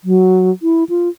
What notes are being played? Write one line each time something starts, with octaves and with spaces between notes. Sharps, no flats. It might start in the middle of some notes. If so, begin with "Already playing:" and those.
F#3
E4
F4